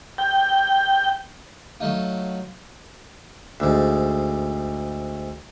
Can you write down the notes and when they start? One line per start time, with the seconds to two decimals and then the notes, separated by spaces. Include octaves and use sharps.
0.18 G5
1.80 F#3 A3 D#4 F4
3.60 D2 G#2